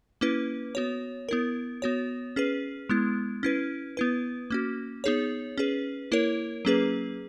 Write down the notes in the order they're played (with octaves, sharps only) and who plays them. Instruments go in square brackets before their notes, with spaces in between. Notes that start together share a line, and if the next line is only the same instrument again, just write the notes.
[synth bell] A#3 C#4 E4 B4
B3 F#4 C#5
B3 E4 A#4
B3 F#4 C#5
C#4 G#4 B4
G#3 B3 E4
C#4 E4 B4
B3 E4 B4
A#3 C#4 F#4
B3 D#4 G#4 C#5
C#4 G#4 B4
A#3 E4 A#4 C#5
F#3 A#3 C#4 G#4 B4